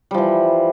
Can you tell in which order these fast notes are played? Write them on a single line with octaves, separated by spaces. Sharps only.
G3 F3 E3